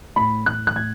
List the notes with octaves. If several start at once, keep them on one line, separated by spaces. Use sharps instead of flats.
A2 B5
A2 F#6
F#6
A2 G#6